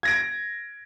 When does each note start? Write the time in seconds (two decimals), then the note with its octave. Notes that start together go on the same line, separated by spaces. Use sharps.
0.03 G#6 A#6 D7